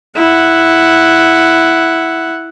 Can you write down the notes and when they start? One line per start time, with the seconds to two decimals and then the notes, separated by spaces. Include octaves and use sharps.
0.16 E4 F#5